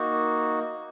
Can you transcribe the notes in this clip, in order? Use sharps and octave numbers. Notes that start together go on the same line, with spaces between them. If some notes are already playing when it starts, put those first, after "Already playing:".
Already playing: A#3 D#4 F#4